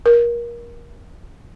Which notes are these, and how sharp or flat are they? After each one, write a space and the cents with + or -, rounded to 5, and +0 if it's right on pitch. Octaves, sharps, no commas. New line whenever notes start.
A#4 +25